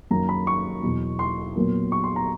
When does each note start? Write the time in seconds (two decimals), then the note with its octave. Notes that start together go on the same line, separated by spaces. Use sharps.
0.10 F#2 D#3 F#3 A#3 A#5
0.29 B5
0.47 C#6
0.83 E2 B2 F#3
1.19 C6
1.56 A#2 F#3 B3
1.92 C#6
2.04 C6
2.16 A#5